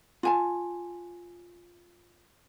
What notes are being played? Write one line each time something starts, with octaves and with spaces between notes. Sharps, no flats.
F4 G#5 A5